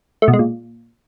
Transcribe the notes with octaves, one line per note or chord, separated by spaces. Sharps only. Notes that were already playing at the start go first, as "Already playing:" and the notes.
A3
B2
G#3
A#2